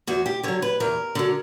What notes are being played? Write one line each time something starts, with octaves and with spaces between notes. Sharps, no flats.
E2 F#4
G4
D3 F#3 C#5
B4
E2 A#4
D3 F#3